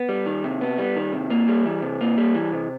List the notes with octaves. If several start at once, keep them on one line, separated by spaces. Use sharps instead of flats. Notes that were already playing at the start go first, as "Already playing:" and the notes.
Already playing: B3
G3
D#3
C3
B3
G3
D#3
C3
A#3
G3
E3
C3
A#3
G3
E3
C3